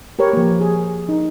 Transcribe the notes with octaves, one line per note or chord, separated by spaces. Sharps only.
G4 A#4 B4 C#5
F3 A#3
G#4
D#4